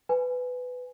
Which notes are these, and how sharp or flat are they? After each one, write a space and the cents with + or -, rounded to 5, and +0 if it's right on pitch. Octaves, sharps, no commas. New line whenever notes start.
B4 +15 G#5 +0